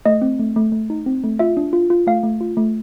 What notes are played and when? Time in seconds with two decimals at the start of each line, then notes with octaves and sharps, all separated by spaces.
0.06 A3 D#5
0.22 C4
0.39 A3
0.56 A3
0.72 A3
0.90 D#4
1.06 C4
1.24 A3
1.39 F4 E5
1.57 D4
1.73 F4
1.90 F4
2.07 A3 F5
2.23 A3
2.41 F4
2.57 A3